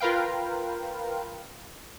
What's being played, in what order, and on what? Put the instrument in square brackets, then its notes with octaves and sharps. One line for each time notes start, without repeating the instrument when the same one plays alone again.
[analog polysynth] F4 A#4 B4 F5 G5